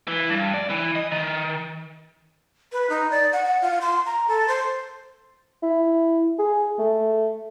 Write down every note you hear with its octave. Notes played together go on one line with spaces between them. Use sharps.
E3
G2
D5
E3
D#5
D#3
B4
D#4
D5
F#5
F#5
F4
C6
A#5
A4
C5
E4
G#4
A3